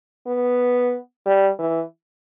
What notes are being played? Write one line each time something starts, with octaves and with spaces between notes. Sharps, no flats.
B3
G3
E3